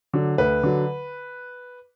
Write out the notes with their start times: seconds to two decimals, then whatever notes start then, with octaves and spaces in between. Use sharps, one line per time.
0.13 D3 F#3
0.38 D2 B4
0.63 D3 F#3